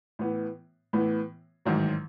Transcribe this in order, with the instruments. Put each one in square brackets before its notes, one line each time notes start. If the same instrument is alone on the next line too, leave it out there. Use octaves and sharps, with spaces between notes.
[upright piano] A2 E3 B3
A2 E3 B3
A1 G#2 D#3 F#3